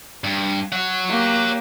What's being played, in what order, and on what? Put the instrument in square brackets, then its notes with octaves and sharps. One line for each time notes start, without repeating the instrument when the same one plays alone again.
[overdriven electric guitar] G2
C#5 F#5
[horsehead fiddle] A#3 G4